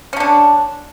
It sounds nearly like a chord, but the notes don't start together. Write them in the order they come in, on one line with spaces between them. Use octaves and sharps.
C#4 D3 D4